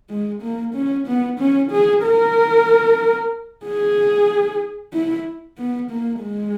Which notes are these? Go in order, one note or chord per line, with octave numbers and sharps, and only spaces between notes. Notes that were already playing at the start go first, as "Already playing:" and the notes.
G#3
A#3
C#4
B3
C#4
G#4
A#4
G#4
E4
B3
A#3
G#3